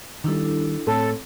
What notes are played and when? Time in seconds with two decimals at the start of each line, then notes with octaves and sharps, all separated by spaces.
0.24 D#3 G3 D4 E4 A4
0.87 A2 C4 A4 C#5